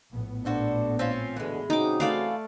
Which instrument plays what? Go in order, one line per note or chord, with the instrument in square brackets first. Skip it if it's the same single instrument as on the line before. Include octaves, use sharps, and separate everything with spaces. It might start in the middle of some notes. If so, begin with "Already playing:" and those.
[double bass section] A#1 A2 B3
[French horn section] D4 [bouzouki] F#4 A4 C5
[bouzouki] C4 C#4 F4
[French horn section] E2 B2 D3 [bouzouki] E3 G#3
[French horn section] C#3 C4 F#4 [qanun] D#4 D6
[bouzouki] E3 F4 [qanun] A3 D5 F5